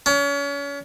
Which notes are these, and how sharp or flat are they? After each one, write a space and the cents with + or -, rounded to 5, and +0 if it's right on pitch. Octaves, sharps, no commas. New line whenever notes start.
C#4 +35